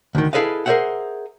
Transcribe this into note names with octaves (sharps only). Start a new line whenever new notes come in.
D2 D#3
E4 G#4 A4 B4 D#5 F5
G#4 A#4 C5 C#5 E5 F#5